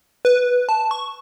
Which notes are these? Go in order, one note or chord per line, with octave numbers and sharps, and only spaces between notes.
B4
A5
C#6